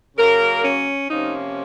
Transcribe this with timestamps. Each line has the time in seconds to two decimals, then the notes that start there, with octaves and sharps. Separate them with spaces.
0.16 C#3 F#3 A#3 C#4 A#4
0.63 C#4
1.10 C3 F3 A#3 C#4 D#4